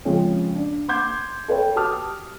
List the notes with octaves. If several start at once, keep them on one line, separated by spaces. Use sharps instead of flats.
C#3 F3 G#3 C4 C#4
D4
C6 D6 G6 G#6
A4 B4 C#5 G5
F#4 G4 A5 D6 D#6 F6